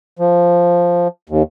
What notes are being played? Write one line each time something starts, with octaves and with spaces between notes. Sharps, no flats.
F3
D#2